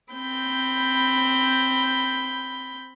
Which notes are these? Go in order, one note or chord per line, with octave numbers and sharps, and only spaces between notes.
C4 B5 G6